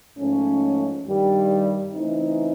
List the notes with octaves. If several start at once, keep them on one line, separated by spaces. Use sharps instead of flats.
G#2 F3 A3 C#4
G2 D#3 G3
C#3 E3 A3 C4 D#4